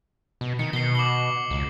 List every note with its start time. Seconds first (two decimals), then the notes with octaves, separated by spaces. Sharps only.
0.41 B2
0.59 D#3 C#7
0.73 B2 C7 G7
0.95 D6 F#7 G7
1.51 C#2